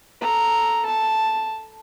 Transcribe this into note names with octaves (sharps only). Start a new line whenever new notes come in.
A4 A#5
A5